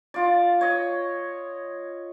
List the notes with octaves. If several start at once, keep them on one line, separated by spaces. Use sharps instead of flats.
F4 D5
C#5 D#5